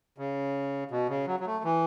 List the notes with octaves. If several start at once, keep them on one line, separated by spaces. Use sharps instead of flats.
C#3
B2
C#3
F#3
F#3
A3
E3